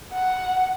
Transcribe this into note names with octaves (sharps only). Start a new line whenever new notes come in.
F#5